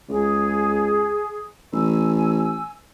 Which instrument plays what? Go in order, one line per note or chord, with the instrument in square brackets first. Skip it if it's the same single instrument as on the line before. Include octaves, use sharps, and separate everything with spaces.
[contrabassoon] C#2 [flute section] G#4
[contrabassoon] A1 [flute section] G#5 E6